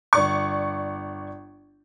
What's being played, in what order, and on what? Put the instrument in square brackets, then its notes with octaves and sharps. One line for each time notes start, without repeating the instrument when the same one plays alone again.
[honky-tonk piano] G1 D5 C#6